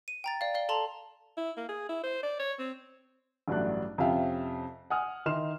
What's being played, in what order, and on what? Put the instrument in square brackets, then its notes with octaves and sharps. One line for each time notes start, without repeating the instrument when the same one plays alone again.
[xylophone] D#7
G5 A#5 A6
D5 F5
D5 F5 G7
A4 A5 A#5 C6 F7
[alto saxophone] E4
A#3
G#4
E4
C5
D5
C#5
C4
[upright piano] A1 G2 F#3 A3 D4 F#6
F2 C3 C#4 E5 F5 G5
F#5 G#5 D#6 F6
D#3 D#4 E4 C6 F6 E7